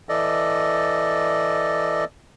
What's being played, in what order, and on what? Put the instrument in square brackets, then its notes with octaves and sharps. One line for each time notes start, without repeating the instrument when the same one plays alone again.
[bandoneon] E3 A4 D5 D#5